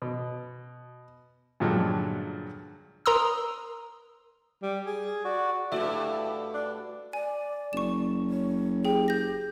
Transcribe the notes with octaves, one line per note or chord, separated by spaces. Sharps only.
B2
G2 A#2 D3 F3 F#3 G#3
A#4 A#5 C6 D#6 E6
G3
G#4
F#4 D5
G2 A3 E4 F#4 D5
D4
D5 G#5
F#1 C#6 E7
C#5
G4 G#4 G5
G6 A#6